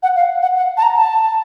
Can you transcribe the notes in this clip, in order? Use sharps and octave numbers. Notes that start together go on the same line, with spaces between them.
F#5
F5
F#5
F#5
A5
A#5
A5